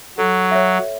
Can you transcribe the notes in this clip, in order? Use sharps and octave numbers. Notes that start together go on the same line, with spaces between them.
F#3 A4
C#5 E5